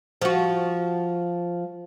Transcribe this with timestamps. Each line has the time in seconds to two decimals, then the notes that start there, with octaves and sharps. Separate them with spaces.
0.22 F3 F#4